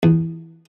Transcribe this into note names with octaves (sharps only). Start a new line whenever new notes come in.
E2